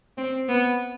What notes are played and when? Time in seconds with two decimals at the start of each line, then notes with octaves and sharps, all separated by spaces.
0.17 C4
0.48 B3